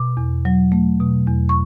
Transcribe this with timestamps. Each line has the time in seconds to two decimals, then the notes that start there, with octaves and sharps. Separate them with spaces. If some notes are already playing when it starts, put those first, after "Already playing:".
Already playing: B2 D6
0.17 E2
0.45 F#3
0.72 A3
1.00 B2
1.27 E2
1.49 C#6